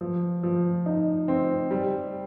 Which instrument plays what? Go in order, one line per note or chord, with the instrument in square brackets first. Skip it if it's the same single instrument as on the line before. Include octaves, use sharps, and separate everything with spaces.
[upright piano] F3
F3
D#4
C4
G3